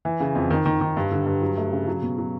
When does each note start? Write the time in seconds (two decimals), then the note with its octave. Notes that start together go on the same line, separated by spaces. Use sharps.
0.05 E3
0.20 C#3
0.35 F2
0.50 D#3
0.66 D#3
0.81 D#3
0.97 G2
1.11 D3
1.26 G2
1.42 F#3
1.57 A3
1.72 C#3
1.87 F#3
2.02 B2
2.18 F#3